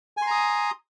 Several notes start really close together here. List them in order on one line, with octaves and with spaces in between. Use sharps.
G#5 C6 A#5 D#6